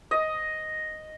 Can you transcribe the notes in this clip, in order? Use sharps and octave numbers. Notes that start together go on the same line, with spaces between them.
D#5